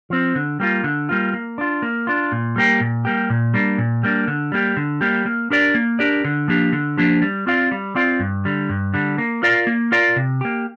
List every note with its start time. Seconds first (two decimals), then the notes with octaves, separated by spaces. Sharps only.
0.10 F3 C4
0.35 D3
0.60 G3 A#3 F4
0.84 D3
1.09 G3 A#3 F4
1.34 A#3
1.58 D4 F4
1.82 A#3
2.07 D4 F4
2.32 A#2
2.56 G3 A#3 G4
2.80 A#2
3.05 G3 A#3 G4
3.30 A#2
3.54 G3 A#3 D4
3.78 A#2
4.03 G3 A#3 D4
4.28 D3
4.52 G3 A#3 G4
4.77 D3
5.01 G3 A#3 G4
5.26 A#3
5.50 D4 G4 A#4 D5
5.75 A#3
5.99 D4 G4 A#4 D5
6.25 D3
6.48 F3 A#3 D4 G4
6.73 D3
6.98 F3 A#3 D4 G4
7.22 G3
7.47 C4 F4 D5 F5
7.72 G3
7.95 C4 F4 D5 F5
8.20 G2
8.45 D3 G3
8.69 G2
8.94 D3 G3
9.18 A#3
9.43 F4 A#4 D5 F5
9.67 A#3
9.92 F4 A#4 D5 F5
10.16 C3
10.41 A#3 G4